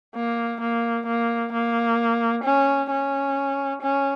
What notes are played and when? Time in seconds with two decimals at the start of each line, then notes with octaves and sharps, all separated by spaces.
0.16 A#3
0.61 A#3
1.07 A#3
1.53 A#3
2.44 C#4
2.90 C#4
3.82 C#4